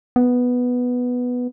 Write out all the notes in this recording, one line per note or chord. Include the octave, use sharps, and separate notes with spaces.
B3